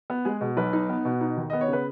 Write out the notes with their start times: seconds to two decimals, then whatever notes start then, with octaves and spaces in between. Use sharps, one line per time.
0.10 B3
0.25 G#3 G#4
0.41 B2
0.57 B1 B4
0.73 D#4
0.89 B3
1.05 B2
1.21 D#4
1.37 D#2
1.50 B3 D#5
1.61 C#5
1.68 C#3
1.73 B4